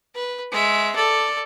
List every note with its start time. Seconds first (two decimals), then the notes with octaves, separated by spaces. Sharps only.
0.15 B4
0.52 G#3 E5
0.95 A4 D5